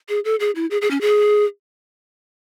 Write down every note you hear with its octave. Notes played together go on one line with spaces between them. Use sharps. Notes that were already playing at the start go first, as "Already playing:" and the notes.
G#4
A4
G#4
E4
G#4
G#4
C#4
G#4